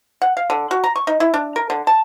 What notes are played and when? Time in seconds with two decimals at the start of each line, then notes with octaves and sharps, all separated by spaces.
0.22 F#5
0.37 F5
0.50 D3
0.71 F#4
0.84 A#5
0.96 C#6
1.07 D#4
1.20 E4
1.34 D4
1.56 A#4
1.70 D3
1.87 A5